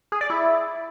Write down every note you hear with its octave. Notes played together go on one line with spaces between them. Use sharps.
G#4
D5
E4